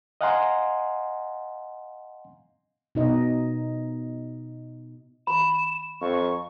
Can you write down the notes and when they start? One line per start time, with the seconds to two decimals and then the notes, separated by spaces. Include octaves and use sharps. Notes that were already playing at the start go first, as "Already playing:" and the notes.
0.21 D#5 F5 F#5 G#5 A#5 C6
2.95 B2 D#4 D#5
5.27 B5 E7
6.01 F2 C#6